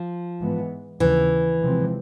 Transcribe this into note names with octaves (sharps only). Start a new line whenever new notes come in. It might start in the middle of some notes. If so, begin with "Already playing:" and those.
Already playing: F3
G#2 E3 G#3 B3
D#2 C#3 E3 F3
C3 F3 G#3 C4